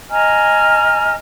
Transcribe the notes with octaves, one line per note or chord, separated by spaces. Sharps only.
D#5 G#5 A#5 F6